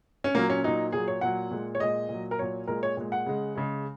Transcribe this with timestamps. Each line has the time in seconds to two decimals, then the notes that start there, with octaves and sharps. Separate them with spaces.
0.24 C#4
0.35 A#2 F#3 A#3
0.50 C#4
0.63 A#2 F#3 D#4
0.92 A#2 F#3 G#4
1.08 C#5
1.21 A#2 F#3 F#5
1.51 A#2 G#3
1.75 C#5
1.80 A#2 G#3 D#5
2.09 A#2 F#3
2.31 A#4
2.39 A#2 F#3 C#5
2.67 A#2 G#3 A#4
2.83 C#5
2.97 A#2 G#3
3.12 F#5
3.26 C#3 G#3
3.55 C#3 G#3